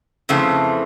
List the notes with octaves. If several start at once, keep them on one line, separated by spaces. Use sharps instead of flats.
F2 C#3 E3 A3 C4